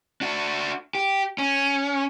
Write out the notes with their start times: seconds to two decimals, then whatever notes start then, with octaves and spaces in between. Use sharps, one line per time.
0.21 D4 F#4
0.95 G4
1.38 C#4